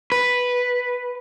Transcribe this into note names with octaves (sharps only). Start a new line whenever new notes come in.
B4